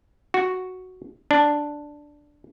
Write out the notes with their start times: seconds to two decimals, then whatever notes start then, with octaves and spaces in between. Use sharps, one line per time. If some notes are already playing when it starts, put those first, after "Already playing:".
0.34 F#4
1.31 D4